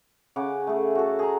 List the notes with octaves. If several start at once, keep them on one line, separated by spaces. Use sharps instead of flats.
C#3 F#5 D6
A3 G#4
F#4 A4
G#4 A#5